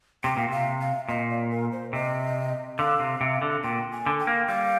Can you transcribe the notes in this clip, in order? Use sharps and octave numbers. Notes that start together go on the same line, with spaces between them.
C3 G5
A#2
C3 F5
F5
A#2 D#5
D5
A#4
C5
C3 D#5
D3 F5
C3
C3
D3
A#2 G5
G#5
D3
G5
A#3
G3 F5